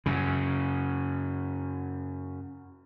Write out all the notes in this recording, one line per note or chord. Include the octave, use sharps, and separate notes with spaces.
F#2 C#3